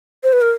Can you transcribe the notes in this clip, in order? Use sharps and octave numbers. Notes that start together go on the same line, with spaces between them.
C5
B4
A#4